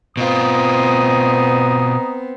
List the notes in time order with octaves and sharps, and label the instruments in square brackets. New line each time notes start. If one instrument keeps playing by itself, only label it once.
[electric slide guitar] B2 F4 [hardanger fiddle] B3 C4 [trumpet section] D#5 A#5 D#6